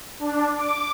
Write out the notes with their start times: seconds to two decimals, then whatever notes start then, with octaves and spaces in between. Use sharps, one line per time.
0.19 D4
0.56 D6